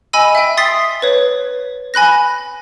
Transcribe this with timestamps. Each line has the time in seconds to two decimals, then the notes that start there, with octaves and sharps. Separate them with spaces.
0.13 D#5 G#5 B5 E6 D#7
0.35 E5 G5
0.57 C6 D#6 A6 B6 C7
1.02 B4 C#5
1.94 G#5 B5 F#6 A#6